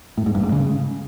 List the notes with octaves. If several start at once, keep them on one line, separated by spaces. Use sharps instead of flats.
A2
G#2
G2
G#2
C#3